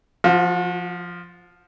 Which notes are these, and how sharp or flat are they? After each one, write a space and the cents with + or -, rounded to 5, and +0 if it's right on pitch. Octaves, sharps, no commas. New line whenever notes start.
F3 +0 F#4 -40